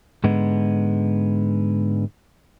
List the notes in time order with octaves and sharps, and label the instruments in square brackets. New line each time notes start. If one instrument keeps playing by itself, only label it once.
[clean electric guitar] G#2 D3 G#3 B3